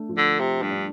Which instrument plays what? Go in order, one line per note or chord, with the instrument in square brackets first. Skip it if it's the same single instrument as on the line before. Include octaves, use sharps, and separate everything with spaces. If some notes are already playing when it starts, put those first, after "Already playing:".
Already playing: [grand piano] A3 D4
F3
[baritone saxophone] D3
[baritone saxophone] C3 [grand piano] G4
[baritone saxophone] G2
[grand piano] D4